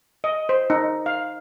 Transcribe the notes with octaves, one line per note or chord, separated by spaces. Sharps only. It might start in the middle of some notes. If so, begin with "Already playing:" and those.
D#5
C5
D#4
F5